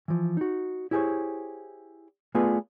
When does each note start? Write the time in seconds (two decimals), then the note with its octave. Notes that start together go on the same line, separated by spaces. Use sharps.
0.08 E3 F3
0.37 D#4 F#4
0.91 E4 G4 G#4 A#4 C5 C#5
2.35 A3 B3 F4 G#4 B4 D5